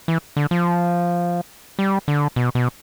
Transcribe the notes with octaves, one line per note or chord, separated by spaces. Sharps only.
E3
D3
F3
G3
D3
B2
B2